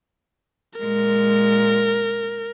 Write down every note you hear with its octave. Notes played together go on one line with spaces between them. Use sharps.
A#2 G#3 A#4